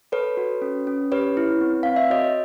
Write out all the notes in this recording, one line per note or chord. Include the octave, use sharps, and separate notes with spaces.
A4 B4 C#5
F#4
C#4
C#4
G4 B4 C#5
E4
C4
C4 F5
E5
F#4 C#5 D#5